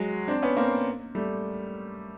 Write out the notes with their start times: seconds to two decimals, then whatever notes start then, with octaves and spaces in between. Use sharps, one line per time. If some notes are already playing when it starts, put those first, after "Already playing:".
Already playing: F#3 G#3
0.27 C4 D4
0.42 B3 C#4
0.57 A#3 C4
1.15 G3 A3